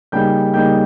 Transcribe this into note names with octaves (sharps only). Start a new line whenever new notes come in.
C#3 G3 A#3 D#4 G5 G6
C#3 G3 A#3 D#4 G5 G6